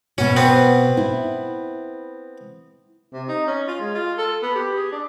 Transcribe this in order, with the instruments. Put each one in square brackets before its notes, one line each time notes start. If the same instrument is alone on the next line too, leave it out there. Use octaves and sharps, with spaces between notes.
[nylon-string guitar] B2 F#4 [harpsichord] C#4
[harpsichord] B3 C4
[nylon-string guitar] E4
[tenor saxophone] C3
D#4
C#4
F4
G#3
F4
A4
B3
G4
G#4
D4